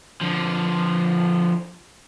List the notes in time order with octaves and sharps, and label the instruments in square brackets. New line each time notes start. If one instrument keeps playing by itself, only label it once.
[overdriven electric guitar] D3 F3